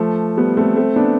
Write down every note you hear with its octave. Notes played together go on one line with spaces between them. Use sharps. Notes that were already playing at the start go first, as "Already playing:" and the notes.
Already playing: F3 A3
G3 B3
A3 C4
A3 C4
B3 D4